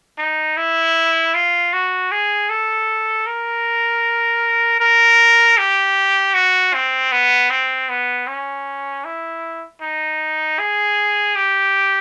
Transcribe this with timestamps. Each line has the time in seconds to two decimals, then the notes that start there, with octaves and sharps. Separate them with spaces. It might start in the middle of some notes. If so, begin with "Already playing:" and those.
0.18 D#4
0.57 E4
1.34 F4
1.73 F#4
2.12 G#4
2.49 A4
3.27 A#4
4.80 A#4
5.58 G4
6.34 F#4
6.74 C4
7.12 B3
7.50 C4
7.90 B3
8.28 C#4
9.05 E4
9.82 D#4
10.59 G#4
11.36 G4